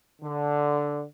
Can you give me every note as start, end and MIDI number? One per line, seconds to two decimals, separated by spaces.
0.22 1.03 50